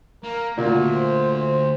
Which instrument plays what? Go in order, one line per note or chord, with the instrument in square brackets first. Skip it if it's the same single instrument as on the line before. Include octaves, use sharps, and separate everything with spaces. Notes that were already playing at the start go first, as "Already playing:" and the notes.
[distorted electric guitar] A#3 [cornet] A#4
[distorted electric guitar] D2 [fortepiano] A#2 [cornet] F#4
[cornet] C5
C5